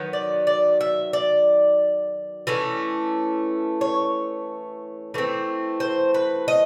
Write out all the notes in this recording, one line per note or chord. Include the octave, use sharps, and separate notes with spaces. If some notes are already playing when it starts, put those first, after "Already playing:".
Already playing: D#3 F#3 B3
D5
D5
E5
D5
E3 A3 C#4
C#5
E3 A3 C4
C5
B4
D#5